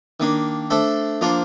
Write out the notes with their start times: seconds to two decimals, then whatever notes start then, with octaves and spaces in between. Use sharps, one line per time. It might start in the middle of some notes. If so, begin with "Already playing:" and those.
0.20 D#3 A#3 D4
0.70 A3 D4 A4 C5
1.21 F3 A#3 D4 F4 C5